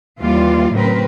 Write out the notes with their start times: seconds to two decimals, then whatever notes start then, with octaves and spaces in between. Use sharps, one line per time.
0.21 D#2 E3 G3 F4 D5
0.73 A2 C#3 F#3 C4 A#4 B4